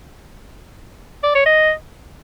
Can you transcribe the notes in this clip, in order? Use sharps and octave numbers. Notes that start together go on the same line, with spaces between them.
D5
C#5
D#5